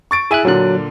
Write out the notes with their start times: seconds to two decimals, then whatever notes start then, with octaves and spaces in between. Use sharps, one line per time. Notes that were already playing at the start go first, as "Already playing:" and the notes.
0.11 C#6 A6 D7
0.31 E4 G#4 E5 G#5 F#6 D#7
0.45 A#2 D3 F#3 F#6